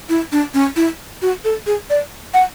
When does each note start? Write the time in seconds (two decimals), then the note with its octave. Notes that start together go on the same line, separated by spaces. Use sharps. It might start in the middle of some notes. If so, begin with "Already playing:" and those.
0.09 E4
0.32 D4
0.54 C#4
0.76 E4
1.22 F#4
1.45 A4
1.67 G#4
1.90 D5
2.34 F#5